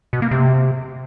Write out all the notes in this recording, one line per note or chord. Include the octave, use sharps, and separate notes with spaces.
B2
A#3
C3